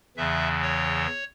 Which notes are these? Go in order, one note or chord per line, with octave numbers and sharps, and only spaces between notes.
E2 C#3 E3 E5
C#5